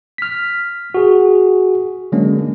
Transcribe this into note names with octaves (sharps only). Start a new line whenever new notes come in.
F6 B6
F#4 G#4
D3 F#3 G#3 A#3 C#4 D4